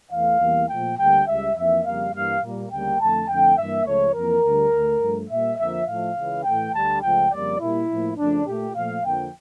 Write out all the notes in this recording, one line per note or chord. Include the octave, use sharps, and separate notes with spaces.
E2 E3 A3 F5
E2 E3 G3 A#3
A#2 F3 A3 G5
D2 D3 G3 A#3 G5
C#2 C#3 G3 E5
F2 E3 A#3 E5
F2 C#3 G3 A#3 F5
G2 E3 G3 A#3 F5
A#2 G3 A#3
D2 C#3 G3 A#3 G5
F2 D3 A3 A5
F2 D3 A3 G5
G2 E3 A#3 E5
C#2 C#3 F3 A3 C#5
F2 E3 A#3 A#4
D2 D3 G3
D2 D3 A3
G2 F3 A3
A#2 G3 A#3 E5
F2 D3 F3 A#3 E5
A2 F3 A3 F5
C#2 C#3 E3
A2 E3 A3 G5
D2 D3 G3 A5
C#2 C#3 F3 A3 G5
F2 C#3 G3 A#3 D5
A#2 G3 A#3 E4
A2 F3 A#3
F2 C#3 F3 A3 D4
A#2 A3 G4
A#2 F3 A3 F5
F2 D3 F3 A#3 G5